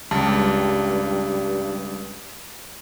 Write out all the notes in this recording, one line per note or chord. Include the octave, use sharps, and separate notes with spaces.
C#2 G2 G3 A5